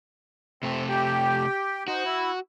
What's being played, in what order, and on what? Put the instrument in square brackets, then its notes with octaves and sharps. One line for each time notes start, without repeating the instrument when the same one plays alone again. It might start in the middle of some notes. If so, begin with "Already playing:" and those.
[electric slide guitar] C3 A3 [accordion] C4
[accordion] G4 G5
[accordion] D#4 C5 [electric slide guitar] F#4
[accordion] E4